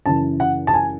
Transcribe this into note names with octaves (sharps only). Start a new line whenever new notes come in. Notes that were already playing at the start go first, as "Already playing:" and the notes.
F#2 C#3 E3 A5
F#5
A5
G#5